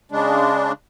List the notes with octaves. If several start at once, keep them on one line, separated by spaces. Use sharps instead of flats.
C#3 G#3 D4